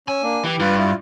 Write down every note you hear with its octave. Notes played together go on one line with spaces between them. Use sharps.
C#4 G#5 E6
A#3 D4
E3 G4
G2 F4 B4
E4 F4